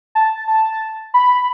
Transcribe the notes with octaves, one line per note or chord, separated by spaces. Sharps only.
A5
A5
B5